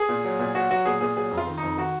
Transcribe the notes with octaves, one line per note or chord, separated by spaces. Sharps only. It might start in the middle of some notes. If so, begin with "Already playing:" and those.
Already playing: G#4
A#2
F#3
A#2
F#3 F#4
F#3 F#4
A#2 G#4
A#2 G#4
F#3 G#4
F2
F4
D#3
D#4
F2
D#3 F#4